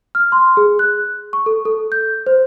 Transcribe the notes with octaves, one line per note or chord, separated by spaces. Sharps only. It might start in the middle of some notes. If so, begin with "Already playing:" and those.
F6
C6
G#4
F#6
C#6
A4
A4
G6
C5